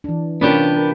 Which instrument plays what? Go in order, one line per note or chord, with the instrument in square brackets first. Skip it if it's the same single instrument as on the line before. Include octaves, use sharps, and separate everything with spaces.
[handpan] E3 D4
[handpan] C3 F4 D5 [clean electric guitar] B3 D4 G4 [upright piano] C#4 A#4
[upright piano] A#4